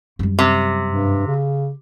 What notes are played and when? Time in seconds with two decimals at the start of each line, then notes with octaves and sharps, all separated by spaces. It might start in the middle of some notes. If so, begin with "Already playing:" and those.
0.19 F#2 G3
0.39 C3
0.87 G2
1.27 C#3